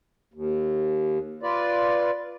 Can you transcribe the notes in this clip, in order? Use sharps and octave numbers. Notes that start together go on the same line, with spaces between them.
D#2
F4 B4 D5